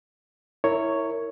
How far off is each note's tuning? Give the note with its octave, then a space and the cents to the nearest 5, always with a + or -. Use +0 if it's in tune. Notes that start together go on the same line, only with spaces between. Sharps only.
E4 -10 A#4 -15 C#5 +0